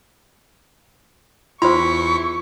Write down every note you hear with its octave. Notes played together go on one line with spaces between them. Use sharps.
E2 E4 F4 C5 C6 C#6 B6